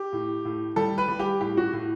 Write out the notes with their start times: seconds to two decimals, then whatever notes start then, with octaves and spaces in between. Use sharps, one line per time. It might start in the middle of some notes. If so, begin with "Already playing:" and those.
Already playing: G4
0.13 A2
0.45 A2
0.76 G3 A4
0.98 B4
1.08 G3
1.19 G4
1.41 A2 G4
1.57 F#4
1.73 A2